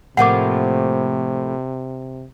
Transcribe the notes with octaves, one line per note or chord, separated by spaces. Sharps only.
A2 C3 F3 A#3 F#5 D6